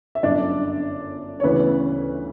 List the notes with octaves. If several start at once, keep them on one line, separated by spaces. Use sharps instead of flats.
E5
G1 F#2 D3 D4 D5
C#5
D2 C#3 E3 B3 B4